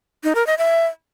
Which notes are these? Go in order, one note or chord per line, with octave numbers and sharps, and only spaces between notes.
D#4
A#4
D#5
E5